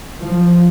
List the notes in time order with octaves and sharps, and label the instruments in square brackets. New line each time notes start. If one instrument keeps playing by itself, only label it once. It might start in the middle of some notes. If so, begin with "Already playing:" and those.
[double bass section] F3